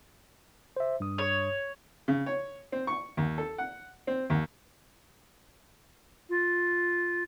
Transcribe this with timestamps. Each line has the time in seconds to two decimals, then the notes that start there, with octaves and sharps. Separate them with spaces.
0.76 C5 E5
1.00 G2 D#6
1.18 C#5
2.08 C#3
2.26 C#5
2.72 C4
2.87 C#6
3.17 D#2
3.38 A4
3.58 F#5
4.07 C4
4.30 D#2
6.29 F4